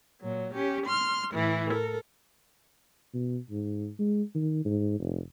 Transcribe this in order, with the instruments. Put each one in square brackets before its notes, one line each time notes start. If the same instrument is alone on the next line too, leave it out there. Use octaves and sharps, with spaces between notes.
[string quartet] A#2 F#3
C#4 G4
C6 F6
A2 E3 E4
A4 A#4
[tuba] B2
G#2
G#3
D#3
G#2
F1